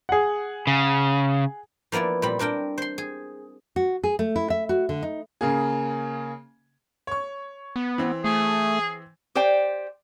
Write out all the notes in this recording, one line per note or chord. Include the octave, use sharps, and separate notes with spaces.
G#4 F#5
C#3
F3 A#3 B3 E4 D5
A#2 G3 C4 B5
C4 D4 A#4 G5
C5 C6
G#4
F#4
G#4
A3
E4
E5
F#4
D3
D#4
C#3 A#3 G#4
C#5 C#6
B3
E3 C4
A3 G#4
G4 C5 D5 G5